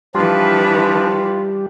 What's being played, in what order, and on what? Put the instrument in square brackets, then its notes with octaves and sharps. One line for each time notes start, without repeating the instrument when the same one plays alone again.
[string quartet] E3 B4 [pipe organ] F3 D4 [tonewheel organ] G3 G4 [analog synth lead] F4